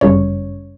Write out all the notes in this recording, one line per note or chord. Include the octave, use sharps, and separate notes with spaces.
G1 F#2 C#3 G3 C#4 C#5